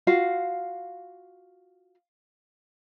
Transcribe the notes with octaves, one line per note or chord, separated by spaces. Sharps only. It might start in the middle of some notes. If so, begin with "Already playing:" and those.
F4 F#4 F5